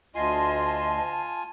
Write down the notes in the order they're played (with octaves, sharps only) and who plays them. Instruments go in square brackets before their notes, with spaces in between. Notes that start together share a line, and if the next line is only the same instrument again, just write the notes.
[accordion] D2 C6 [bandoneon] F4 G#5 [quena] D#5 [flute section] A5